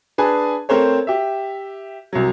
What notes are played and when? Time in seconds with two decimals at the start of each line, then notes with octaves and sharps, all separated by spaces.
0.18 D4 G#4 B4 G#5 A5
0.69 A3 C4 A#4 C5 C#5
1.07 G4 E5
2.13 C2 F#3